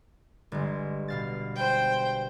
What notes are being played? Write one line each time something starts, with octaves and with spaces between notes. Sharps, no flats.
G1 G#3
B2 F5 A6
C5 G5